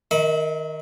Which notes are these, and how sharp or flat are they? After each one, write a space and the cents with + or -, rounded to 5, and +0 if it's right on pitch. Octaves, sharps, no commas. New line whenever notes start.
D#3 +0 E5 -40 B5 +0